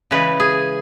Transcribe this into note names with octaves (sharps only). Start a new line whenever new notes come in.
C#3 E3 G#3 B4
G#4